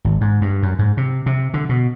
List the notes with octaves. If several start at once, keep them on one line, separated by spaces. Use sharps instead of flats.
G#1
G#2
G2
F#2
G#2
C3
C3
D3
B2